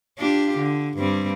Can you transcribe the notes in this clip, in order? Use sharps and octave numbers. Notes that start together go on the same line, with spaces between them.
D4 F4 G4
D3
G2 G3 C4